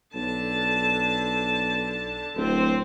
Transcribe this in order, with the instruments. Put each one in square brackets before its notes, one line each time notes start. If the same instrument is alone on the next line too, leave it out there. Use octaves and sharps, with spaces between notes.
[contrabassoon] B1 [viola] D3 A5
[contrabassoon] D1 [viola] C4